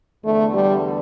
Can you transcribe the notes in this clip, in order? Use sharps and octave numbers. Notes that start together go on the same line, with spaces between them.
E2 D3 A3
G3